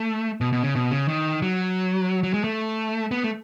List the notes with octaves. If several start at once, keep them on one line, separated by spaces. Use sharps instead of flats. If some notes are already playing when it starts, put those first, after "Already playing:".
Already playing: A3
B2
B2
C#3
B2
C#3
D#3
F#3
F#3
G#3
A3
B3
A3